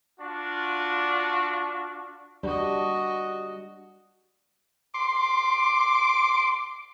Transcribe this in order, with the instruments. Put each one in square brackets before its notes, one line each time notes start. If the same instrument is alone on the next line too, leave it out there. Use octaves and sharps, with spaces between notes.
[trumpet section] D4 F4 F#4
[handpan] G3 D4 [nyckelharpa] F#4 D#5
[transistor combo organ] C6 [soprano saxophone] D6